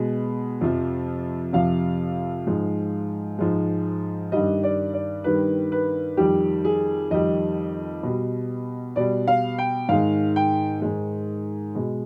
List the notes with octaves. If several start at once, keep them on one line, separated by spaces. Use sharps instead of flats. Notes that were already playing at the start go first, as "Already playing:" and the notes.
Already playing: B2 G#3
F2 C3 F3
F2 C3 F3 F5
G#2 F3 G#3
G#2 F3 G#3
G2 D#3 G3 D#5
D5
D5
G2 D#3 G3 B4
B4
F2 D#3 G3 G4
G#4
F2 D#3 G3 D#5
B2 G3
B2 G3 D5
F5
G5
G#2 D#3 G#3 F5
G5
G#2 D#3 G#3
B2 G#3